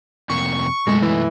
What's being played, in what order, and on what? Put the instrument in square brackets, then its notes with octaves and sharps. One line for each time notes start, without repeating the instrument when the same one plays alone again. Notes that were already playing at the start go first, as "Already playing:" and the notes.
[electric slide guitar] F2 C3 A#3 [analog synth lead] C#6
[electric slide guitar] F#2 B2 A3 [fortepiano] G#3
[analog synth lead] E3